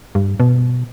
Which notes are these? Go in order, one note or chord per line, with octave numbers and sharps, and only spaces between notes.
G2
B2